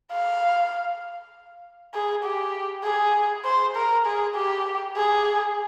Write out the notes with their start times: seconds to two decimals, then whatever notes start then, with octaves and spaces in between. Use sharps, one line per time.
0.11 F5
1.94 G#4
2.24 G4
2.84 G#4
3.45 C5
3.76 A#4
4.06 G#4
4.35 G4
4.97 G#4